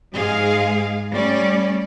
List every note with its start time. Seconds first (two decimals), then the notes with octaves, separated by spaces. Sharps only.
0.15 G#2 G#3 G#4 F5
1.11 G3 A3 C#4 D5